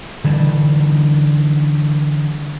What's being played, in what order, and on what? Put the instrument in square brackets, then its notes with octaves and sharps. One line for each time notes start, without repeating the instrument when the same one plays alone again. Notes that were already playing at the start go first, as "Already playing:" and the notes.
[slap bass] D3 E3 G3